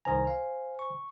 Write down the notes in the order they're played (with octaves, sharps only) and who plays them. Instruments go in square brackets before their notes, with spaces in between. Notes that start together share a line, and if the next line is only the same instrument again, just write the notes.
[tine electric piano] C2 D#3 A#5 [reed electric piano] C5 G#5
[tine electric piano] F5
C#6